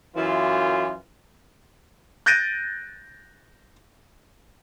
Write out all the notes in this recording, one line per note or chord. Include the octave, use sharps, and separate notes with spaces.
F#2 E3 F4
F#6 G6 A6 A#6 D7 D#7